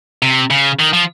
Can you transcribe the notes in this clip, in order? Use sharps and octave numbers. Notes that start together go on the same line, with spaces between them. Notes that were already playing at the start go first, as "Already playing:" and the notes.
C3
C#3
D#3
F3